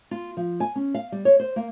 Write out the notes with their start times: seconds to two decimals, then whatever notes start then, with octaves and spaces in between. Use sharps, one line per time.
0.11 F4
0.37 F3
0.60 G#5
0.76 C#4
0.95 F5
1.12 G3
1.25 C#5
1.40 C5
1.56 A#3